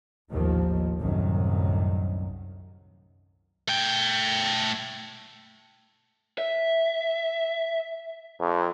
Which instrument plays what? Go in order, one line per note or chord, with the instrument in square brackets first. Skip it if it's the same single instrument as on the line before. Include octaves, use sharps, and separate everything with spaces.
[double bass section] A1 D#2 G#2 D#3 F3
C2 F#2 A2 D#3
[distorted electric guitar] A3 G5
[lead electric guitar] E5
[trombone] F2